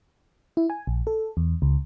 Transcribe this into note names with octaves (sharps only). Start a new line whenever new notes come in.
E4
G#5
A#1
A4
E2
C#2